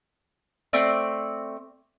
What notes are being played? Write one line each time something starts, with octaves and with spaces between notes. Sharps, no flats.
A3 C4 D5